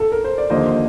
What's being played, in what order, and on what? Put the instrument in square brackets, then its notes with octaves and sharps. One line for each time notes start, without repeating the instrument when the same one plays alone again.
[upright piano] A4
A#4
C5
D5
[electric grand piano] D#2 D3 F3 A#3 [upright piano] C5 D#5